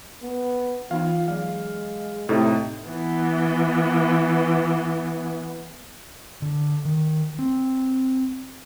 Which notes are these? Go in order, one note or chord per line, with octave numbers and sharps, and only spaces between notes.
B3
E3 B3 D#4 F4 F5
F#3 G#3 F5
A2 C3 A3 D#4 A4 E5 G5
E3 B3
D3
D#3
C4